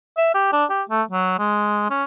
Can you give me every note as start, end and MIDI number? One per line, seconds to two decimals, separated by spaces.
0.17 0.32 76
0.34 0.49 67
0.52 0.65 62
0.70 0.83 67
0.89 1.03 57
1.11 1.36 54
1.39 1.87 56
1.90 2.04 61